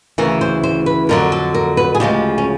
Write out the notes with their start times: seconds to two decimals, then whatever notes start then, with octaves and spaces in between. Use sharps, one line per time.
0.18 D2 C#3 E3 A#4
0.41 C5
0.64 C5
0.86 B4
1.09 F2 D3 F#3 A#4
1.32 A4
1.54 A#4
1.77 B4
1.95 G#4
2.00 D2 C#3 F3 G#3 G4
2.38 C#4